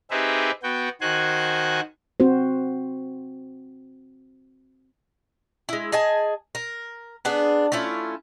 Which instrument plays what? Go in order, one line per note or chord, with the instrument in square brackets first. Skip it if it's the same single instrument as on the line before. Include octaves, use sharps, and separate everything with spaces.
[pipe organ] C4 D#4 G4 G#4 B4 E5
B3 F#4 G5
D#3 F#4 C5 G#5 F#6
[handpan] C4 F#4 C5
[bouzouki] G#3 E4
G#4 D#5 G#5 A5
A#4
B3 D4 G#4
A3 C#4 E4 F4